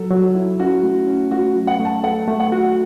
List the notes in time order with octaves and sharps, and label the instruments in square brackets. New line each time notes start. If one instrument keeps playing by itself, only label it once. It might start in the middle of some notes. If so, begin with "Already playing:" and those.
Already playing: [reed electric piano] F#3 [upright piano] A4
[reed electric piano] F#3
E4
[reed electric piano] C#4 [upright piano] F#4
[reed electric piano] A3
C#4
[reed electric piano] A3 [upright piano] F#4
[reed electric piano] F#3
[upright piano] F#5
[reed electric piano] A3
[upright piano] A5
[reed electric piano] A4 [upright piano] F#5
[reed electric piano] A3
[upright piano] F#5
[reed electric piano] F#4